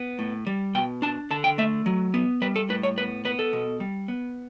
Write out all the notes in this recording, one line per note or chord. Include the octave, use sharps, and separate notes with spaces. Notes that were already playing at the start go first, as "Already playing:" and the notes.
Already playing: B3
A2
G3
B2 G5
D4 A5
D3 A5
G5
A3 E5
F#3
B3
G3 B4
A4
A2 B4
C#5
B3 B4
B3 B4
A4
B2
G3
B3